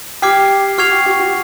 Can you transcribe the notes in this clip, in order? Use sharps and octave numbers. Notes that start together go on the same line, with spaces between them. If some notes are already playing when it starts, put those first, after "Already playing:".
G4 D6 F6 G#6 C7
F#4 C#6 F6 G#6 C7 F7
G4
F#4
F#4